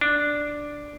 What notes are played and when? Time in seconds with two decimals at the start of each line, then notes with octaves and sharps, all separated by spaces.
0.01 D4